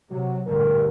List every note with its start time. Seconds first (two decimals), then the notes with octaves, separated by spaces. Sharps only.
0.10 C3 F#3
0.47 A1 G2 A#2 D3 A#4